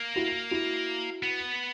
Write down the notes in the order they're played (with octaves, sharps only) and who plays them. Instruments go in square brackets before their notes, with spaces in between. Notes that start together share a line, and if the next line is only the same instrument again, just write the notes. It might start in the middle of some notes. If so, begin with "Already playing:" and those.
Already playing: [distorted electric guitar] A#3
[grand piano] E4 F#4
E4 F#4
[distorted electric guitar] B3